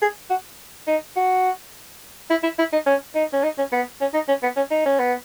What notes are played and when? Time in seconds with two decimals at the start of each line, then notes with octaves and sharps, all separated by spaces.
0.02 G#4
0.30 F#4
0.87 D#4
1.16 F#4
2.30 E4
2.43 E4
2.59 E4
2.72 D#4
2.86 C#4
3.15 D#4
3.33 C#4
3.43 D#4
3.58 C#4
3.72 B3
4.01 C#4
4.14 D#4
4.28 C#4
4.43 B3
4.56 C#4
4.71 D#4
4.86 C#4
4.99 B3